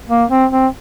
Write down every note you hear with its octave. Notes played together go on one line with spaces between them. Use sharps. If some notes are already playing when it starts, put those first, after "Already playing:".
A#3
C4
C4